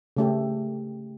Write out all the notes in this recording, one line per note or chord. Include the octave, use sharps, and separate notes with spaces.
C#3 A3 G4